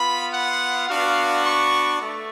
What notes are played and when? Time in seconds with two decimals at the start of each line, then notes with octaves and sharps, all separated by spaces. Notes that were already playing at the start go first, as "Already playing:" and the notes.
Already playing: B3 F4 B5
0.33 F#5
0.89 B3 D4 F#4 F5
1.45 C#6
2.01 A3